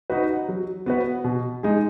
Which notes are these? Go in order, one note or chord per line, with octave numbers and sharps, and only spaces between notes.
D#4 F#4 B4
F#3
B3 F#4 B4
B2
G#3 D#4 G#4